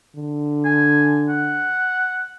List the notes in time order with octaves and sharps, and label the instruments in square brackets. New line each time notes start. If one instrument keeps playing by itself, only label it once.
[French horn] D3
[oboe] G#5
F#5